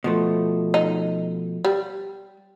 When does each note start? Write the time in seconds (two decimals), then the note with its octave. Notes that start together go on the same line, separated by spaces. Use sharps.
0.04 B2 F3 A3
0.74 D#4
1.65 G3